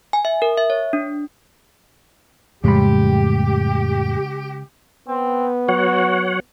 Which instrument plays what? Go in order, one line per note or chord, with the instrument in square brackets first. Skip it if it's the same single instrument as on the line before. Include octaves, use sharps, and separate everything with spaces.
[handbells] G#5
E5
A#4
E5
C#5
D4
[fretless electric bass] F2 A2 G3 [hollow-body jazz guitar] C#3 G#3 B5 [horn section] G4
[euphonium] B3 [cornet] C4
[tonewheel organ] F#3 C#5 F#5 [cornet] F#4